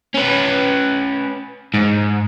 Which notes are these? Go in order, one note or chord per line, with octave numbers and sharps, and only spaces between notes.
C#4 B4
G#2